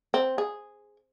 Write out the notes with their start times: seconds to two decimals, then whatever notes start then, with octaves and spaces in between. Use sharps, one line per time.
0.14 C4
0.38 G#4